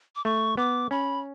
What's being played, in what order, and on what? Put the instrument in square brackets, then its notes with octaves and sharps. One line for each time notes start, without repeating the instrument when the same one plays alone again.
[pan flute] D6
[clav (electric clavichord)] A3 [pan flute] C#6
[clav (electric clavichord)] B3 [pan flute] D6
[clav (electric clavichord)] C#4 [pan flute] B5